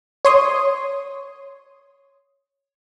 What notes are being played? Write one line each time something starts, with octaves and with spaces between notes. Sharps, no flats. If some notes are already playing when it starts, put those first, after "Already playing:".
C#5 C6 D#6